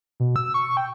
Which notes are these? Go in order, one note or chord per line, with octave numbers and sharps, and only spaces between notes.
B2
E6
C#6
G5